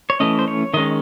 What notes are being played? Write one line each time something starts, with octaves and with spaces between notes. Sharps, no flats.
C#5
E3 A3 C#4 D#5
C5
C#5
D#3 G#3 C#4 D#5